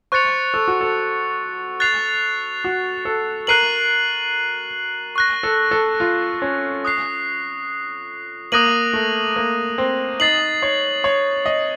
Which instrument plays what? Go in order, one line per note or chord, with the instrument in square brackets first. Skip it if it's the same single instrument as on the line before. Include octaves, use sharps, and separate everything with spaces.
[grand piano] C5 [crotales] C#6 F#6 A6 C#7 F7
[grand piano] A4
F#4
A4
[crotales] F#6 A6 C7 F7
[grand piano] F#4
A4
[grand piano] A#4 [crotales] F#6 C7 D#7 F#7
[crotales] C#6 F#6 A#6
[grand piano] A4
A4
F4
C#4
[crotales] D#6 F#6 C7
[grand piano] A#3 [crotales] D#6 F#6 A#6 D#7 F#7
[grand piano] A3
A#3
C4
[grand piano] D#4 [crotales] A6 C7 F#7
[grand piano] C#5
C#5
D#5